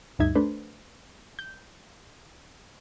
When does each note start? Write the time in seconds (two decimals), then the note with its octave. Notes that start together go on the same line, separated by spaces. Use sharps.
0.19 D2 G2 D#4 E5 G#6
0.35 A3 D4 B4 C5
1.39 G6